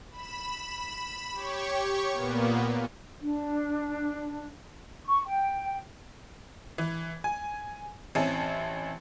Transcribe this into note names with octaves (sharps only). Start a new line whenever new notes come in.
B5 E7
G4 C#5 C#6
A#2 A#3 B3
D4
C#6
G5
E3
G#5
A1 C4 C#4 E4 G#5 A5